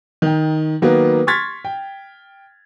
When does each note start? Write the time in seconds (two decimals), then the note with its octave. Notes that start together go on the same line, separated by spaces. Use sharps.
0.22 D#3 G5
0.82 D#3 F#3 A#3 B3
1.27 C6 C#6 F6 G#6 A6 B6
1.65 G5